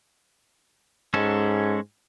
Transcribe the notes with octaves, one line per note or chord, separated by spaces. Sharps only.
G#2 G#3 C#4 A4